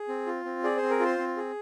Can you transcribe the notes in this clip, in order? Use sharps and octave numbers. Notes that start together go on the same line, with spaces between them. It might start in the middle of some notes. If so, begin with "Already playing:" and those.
Already playing: G#4
C4
F4
C4
G#4 D5
C5
C4
A#4
F4 C5
C4
G#4